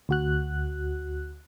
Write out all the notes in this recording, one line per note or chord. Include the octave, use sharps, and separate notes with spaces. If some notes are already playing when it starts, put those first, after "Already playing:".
D2 F#4 F#6